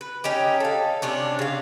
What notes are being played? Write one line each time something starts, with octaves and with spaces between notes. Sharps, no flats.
B4
C#4 D#4 G4
A4 F5
C3 C#4 D4
C#3 F5